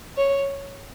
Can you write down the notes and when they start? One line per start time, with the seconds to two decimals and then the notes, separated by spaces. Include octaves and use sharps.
0.17 C#5